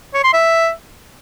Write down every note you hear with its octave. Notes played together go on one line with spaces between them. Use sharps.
C#5
C6
E5